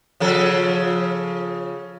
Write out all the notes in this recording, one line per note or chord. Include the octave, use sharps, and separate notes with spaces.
C#3 F3 A4